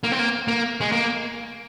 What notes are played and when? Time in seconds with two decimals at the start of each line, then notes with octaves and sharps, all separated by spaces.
0.04 A#3
0.12 C4
0.19 A#3
0.48 A#3
0.81 G#3
0.92 A#3